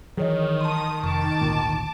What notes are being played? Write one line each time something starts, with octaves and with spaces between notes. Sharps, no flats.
D#3 E3 F#3 G#4 C#5 D#5
A5 C6 D#6
F1 A5 C#6 D6
G#1 D2 A#2